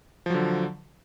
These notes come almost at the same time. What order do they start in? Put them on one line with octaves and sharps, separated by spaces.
F3 F#3 D3